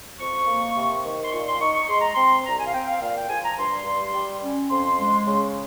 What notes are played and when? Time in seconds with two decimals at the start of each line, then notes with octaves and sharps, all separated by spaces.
0.19 F2 C#6
0.47 A#3
0.75 C3
1.04 D#3
1.24 C6
1.31 A#2 C#6
1.46 C6
1.60 D#4 C#6
1.74 C#6
1.88 G#3 C6
2.00 A#5
2.14 C4 C6
2.45 C2 A#5
2.58 G#5
2.66 F5
2.73 C4 G5
2.87 F5
3.01 A#2 F5
3.16 G5
3.29 F3 G#5
3.43 A#5
3.57 G2 C6
3.85 G2
4.13 G3
4.42 C#4
4.70 F2 C6
4.99 G#3
5.27 C#3